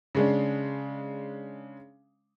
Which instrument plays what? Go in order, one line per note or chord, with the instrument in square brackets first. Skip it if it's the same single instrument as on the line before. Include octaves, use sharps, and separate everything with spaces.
[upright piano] C#3 G#3 D4